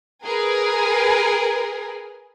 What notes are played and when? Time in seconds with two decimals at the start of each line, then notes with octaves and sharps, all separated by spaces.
0.24 G#4 A#4 B4